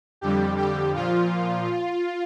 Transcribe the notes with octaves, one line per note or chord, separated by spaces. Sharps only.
F2 D3 G3 G4
G4
A#2 F3 F4